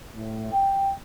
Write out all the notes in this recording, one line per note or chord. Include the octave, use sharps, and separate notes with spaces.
A2
G5